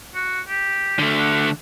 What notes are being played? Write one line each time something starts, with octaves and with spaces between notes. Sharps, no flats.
F#4
G4
D3 A3
F#5